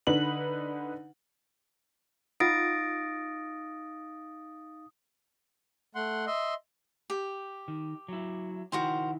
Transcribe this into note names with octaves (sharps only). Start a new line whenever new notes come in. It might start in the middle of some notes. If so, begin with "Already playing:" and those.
D3 D#4 B4 F#7
D#4 F4 F5 F#5 D#6 A6 A#6 D7
A3 F#5 C6
D#5 E5 C6
G4
D#3
F#3 E4
D#3 E4 F#4 A#4 C5 G5